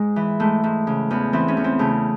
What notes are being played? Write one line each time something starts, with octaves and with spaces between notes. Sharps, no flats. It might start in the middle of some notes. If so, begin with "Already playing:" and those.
Already playing: G#2 G#3
E3
G#2 A3
G#2
C#3
E2
E3 C4
C#4
E2
C4
C#3 A3